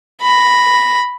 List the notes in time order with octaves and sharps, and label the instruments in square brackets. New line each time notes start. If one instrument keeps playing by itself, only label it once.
[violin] B5 A#6